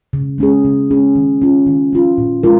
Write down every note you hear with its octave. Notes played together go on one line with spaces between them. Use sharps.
C#3
G#3 C#4 G#4
C#3
G#3 C#4 G#4
D#3
C#4 F4
D#3
C#4 F4
A#2
G#3 F4 A#4